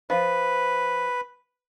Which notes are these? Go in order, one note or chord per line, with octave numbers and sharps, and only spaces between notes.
F3 B4